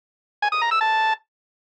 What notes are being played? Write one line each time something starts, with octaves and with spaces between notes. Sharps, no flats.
G#5
D#6
A#5
E6
A5